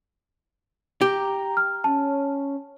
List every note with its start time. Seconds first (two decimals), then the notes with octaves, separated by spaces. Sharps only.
1.01 G4 A#5
1.57 F6
1.84 C#4 A5